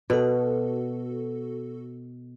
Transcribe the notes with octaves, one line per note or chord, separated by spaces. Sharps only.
B2 F#4 A4